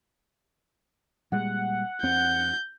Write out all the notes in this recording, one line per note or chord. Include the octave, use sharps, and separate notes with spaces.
A#2 G3 G#3 F#5
E2 C4 G6